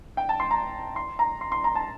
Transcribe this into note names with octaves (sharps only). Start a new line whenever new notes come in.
G5
A5
C6
A#5
C6
A#5
C6
C6
A#5
A5